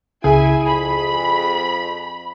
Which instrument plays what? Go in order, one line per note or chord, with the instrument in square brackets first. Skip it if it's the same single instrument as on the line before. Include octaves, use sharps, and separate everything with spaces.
[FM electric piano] C#2 C#3 [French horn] E4 [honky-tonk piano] G#4 [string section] G#5
[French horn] F2 [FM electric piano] G#5 [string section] B5